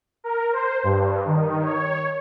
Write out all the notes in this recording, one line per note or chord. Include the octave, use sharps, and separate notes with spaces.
A#4
C5
G2
D#3
C#5